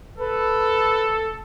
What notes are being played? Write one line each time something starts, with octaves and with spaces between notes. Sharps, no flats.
A4 B4